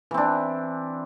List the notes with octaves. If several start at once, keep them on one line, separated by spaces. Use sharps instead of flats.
E3 C4 D4